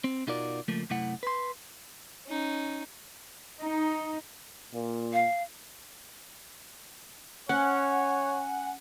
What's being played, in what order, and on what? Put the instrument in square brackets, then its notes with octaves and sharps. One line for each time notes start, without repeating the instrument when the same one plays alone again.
[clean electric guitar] C4
B2 D#4 F4 F#4 A#4 D5
C#2 F3 A3 A#3
F#2 C3 A3 E4 F#5
B4 C6
[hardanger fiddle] C#4 D#4
[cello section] D#4
[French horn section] A#2
[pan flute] F5
[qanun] C#4 [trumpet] C#5 [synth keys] F#5 [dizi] G#5